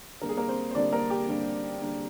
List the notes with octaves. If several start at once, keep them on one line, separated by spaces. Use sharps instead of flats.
D3 G3 A#3 A#4
G#4
A#3 A#4
C4 C5
C5
D3 G3 A#3 D4 D5
A#3 A#4
G4
D3 G3 A#3
D3 G3 A#3